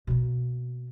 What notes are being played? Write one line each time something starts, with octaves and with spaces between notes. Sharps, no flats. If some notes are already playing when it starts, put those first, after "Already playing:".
B2 A#3